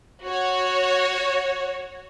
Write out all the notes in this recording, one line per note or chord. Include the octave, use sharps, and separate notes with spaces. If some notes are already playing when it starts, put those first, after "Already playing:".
F#4 C#5